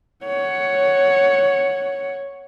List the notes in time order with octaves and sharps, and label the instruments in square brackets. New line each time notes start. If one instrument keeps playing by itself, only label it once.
[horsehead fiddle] C#5 F#5